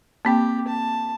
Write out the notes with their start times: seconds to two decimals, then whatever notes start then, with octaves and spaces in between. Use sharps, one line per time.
0.25 A#3 C4 G4 G5
0.67 A5